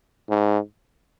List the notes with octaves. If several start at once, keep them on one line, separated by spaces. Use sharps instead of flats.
G#2